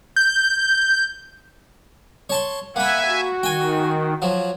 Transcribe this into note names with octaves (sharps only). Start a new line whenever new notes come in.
G6
C#5 A5 C6
A#3 E5 F#5 G#5 B5
F#4
D#3 G5 G#5
F3 F#3